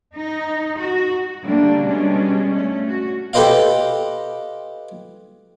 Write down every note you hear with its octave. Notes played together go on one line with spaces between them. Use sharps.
D#4
F#4
D3 G3 A3 A#3 D4
B2 G3 G#3 C#4 D4
A3 C#4
F#4
G4 A4 B4 C5 D#5 F5